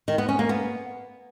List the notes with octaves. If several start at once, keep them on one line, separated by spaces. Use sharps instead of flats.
D#3
B3
C#4
A#3
B3